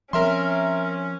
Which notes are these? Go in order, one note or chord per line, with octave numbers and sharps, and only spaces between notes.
F3 C4 C#4 A#4 E5 C6